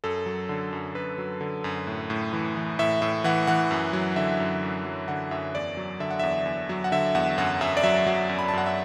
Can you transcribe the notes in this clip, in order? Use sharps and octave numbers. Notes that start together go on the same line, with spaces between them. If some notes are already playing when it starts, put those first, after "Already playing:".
F#2 A4
F#3
D3
F#2
F#2 B4
F#3
D3
F#2
A2
A2
E3
E3
A2 E5
A2 E5
E3 F#5
E3 F#5
F#2
F#3
D3 E5
F#2
F#2
F#3
D3 F#5
F#2 E5
E2 D5
F#3
D3 E5
F#5
E2 E5
E2
F#3
F#5
D3 E5
E2 F#5
F#2 F#5
F#2 E5
D5
F#3 E5
F#3
F#2
B5
A5
F#2 F#5
E5